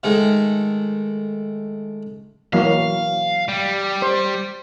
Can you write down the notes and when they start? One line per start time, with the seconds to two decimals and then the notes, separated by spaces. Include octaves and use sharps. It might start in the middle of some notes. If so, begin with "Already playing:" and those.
0.03 D#3 G#3 A3
2.53 E3 F#3 A#3 F5
3.49 G3
4.02 C5